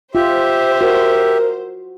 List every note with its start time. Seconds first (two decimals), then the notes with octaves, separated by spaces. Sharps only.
0.15 F4 G4 C5 E5
0.81 F#4 A#4